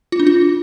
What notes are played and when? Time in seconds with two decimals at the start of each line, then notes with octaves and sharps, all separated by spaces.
0.12 F4
0.20 D4
0.27 F4